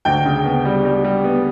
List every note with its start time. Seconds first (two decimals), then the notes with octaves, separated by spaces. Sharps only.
0.05 D2 G5
0.26 C#3
0.45 B3
0.65 G3
0.85 G3
1.04 G3
1.24 B3